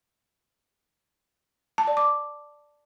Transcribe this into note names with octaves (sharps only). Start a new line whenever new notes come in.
A5
D5
D6